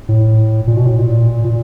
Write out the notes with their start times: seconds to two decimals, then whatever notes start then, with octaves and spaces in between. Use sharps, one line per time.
0.08 A2
0.67 A#2
0.77 B2
0.86 A2
0.96 A#2
1.44 A#2